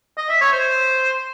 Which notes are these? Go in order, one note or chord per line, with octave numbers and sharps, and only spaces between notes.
D#5
E5
C#5
C5